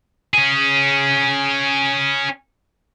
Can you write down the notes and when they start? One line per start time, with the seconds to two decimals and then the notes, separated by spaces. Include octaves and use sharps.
0.34 C#4 G#4